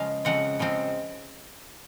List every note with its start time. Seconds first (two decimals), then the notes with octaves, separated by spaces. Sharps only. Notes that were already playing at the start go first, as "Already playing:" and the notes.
Already playing: C#3 F3 G#3 F5
0.25 C#3 F3 G#3 C4 F#5
0.59 C#3 F3 G#3 C4